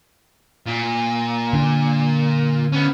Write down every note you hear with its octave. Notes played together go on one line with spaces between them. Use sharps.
A#2
D3 D4
B3 C#4